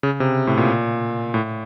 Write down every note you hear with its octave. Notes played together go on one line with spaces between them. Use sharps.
C#3
C3
A2
A#2
A2